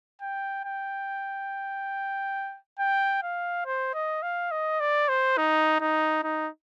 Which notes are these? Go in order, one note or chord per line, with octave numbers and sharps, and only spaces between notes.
G5
G5
G5
F5
C5
D#5
F5
D#5
D5
C5
D#4
D#4
D#4